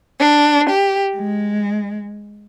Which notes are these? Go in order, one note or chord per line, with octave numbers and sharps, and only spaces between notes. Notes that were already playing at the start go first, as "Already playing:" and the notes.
D4
G4
G#3